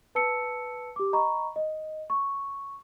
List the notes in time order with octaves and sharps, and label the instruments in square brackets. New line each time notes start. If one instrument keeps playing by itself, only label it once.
[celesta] B4 A5 E6 C#7
G4 D6
D#5 A#5 B5 C#6
D#5
C#6